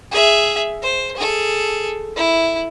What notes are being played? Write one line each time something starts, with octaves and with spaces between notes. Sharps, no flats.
G#4 E5
C5
G#4 A4
E4